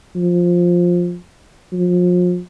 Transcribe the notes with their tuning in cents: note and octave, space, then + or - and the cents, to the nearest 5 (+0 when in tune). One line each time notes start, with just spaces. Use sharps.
F3 +10
F3 +35